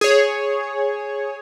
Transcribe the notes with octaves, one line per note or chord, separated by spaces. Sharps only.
G#4 C#5